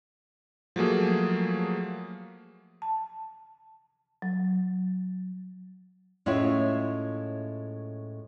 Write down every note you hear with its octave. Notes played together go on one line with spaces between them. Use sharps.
F3 F#3 A3 A#3 G#4
A5
F#3
A2 G#3 C#4 F4 C#5 E5